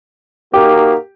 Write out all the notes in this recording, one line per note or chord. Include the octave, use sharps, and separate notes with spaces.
A#3 D#4 F#4 G4